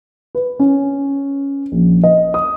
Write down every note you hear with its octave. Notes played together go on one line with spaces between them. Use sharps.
B4
C#4
A#1
D#5
D#6